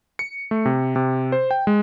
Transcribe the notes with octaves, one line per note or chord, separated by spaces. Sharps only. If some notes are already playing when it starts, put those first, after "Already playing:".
C#7
A3
C3
C3
C5
G5
G#3